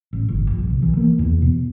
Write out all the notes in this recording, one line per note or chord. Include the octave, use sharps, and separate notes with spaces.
A1
G1
A#1
C2
E3
A#3
E2
B2